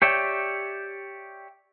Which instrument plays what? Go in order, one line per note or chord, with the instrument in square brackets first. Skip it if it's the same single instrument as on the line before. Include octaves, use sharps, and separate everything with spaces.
[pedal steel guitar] G4 C#5 D5 E5 G5